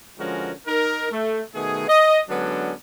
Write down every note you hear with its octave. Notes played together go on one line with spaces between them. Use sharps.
D3 F3 G#3 C#4 F#4 A#4
D#4 A#4
A3
B2 D#3 A3 B3 G#4
D#5
D3 F#3 G#3 B3 C#4 D4